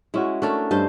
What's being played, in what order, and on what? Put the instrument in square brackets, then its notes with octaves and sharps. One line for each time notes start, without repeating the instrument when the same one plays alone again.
[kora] G#3 C#4 F#4 [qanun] E4
[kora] A3 C#4 [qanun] D4 A4 A#4
[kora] G2 [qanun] C5 D#5 A5